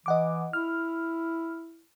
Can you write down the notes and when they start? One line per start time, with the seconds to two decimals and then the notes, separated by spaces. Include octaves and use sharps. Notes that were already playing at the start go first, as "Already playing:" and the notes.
0.06 E3 D#5 F#5 D6
0.53 E4 F6